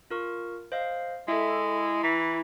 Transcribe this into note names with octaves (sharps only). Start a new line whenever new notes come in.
F4 A#4 C#6
C5 D#5 F5
G#3 E4 A4 E5
E3 A#5